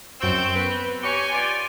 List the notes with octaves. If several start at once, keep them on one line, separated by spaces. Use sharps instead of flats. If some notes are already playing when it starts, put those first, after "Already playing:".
F#2 C4 C#6 E6 G6 E7
B3 B4
F#4 G4 C#5 G#5
F4 G4 D5